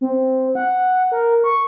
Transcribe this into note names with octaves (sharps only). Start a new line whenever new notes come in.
C4
F#5
A#4
C#6